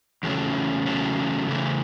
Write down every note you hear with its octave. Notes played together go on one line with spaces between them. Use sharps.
E2 C#3 F#3 A3 C#4
E2 C#3 F#3 A3 C#4
C#3 E3 A3 E4